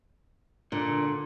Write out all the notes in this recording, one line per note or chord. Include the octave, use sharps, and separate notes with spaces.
A#2 D3